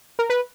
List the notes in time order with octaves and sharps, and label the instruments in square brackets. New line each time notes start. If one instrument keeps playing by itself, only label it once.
[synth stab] A#4
B4